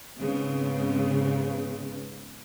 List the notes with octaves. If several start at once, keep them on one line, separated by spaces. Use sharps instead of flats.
G#2 C#3 B3 C4